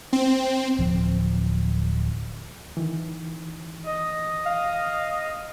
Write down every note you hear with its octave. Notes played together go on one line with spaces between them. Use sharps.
C4
D1 F3 C4
D#3 E3
D#5
F5